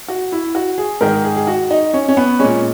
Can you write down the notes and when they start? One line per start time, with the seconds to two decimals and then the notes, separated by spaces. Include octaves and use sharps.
0.08 F#4
0.32 E4
0.55 F#4
0.78 G#4
1.01 G#2 D#3 G#3 A#4
1.24 G#4
1.36 G#4
1.47 F#4
1.71 D#4
1.94 C#4
2.09 C#4
2.17 B3
2.39 A#2 G#3 C#4